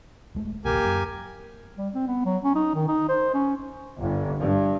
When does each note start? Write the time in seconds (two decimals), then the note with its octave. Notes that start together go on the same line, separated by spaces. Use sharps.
0.35 D#1 G#3 A3
0.65 E1 A1 D2 A#3 G4 G#5
0.85 F#2
1.78 G3
1.94 C4
2.07 B3
2.25 F#3
2.44 C#4
2.56 D#4
2.75 D#3
2.88 D#4
3.09 C5
3.34 C#4
3.99 G1
4.38 G2